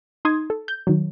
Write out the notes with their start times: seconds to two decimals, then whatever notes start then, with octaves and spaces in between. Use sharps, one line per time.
0.25 D#4 C6 D#6 G#6
0.50 A4
0.68 G6
0.87 D#3 F#3